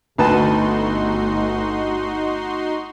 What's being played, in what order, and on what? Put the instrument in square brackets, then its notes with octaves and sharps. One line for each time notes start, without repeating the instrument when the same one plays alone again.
[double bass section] G1 A3 [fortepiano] D2 B4 A5 [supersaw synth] D#4 F#4 C6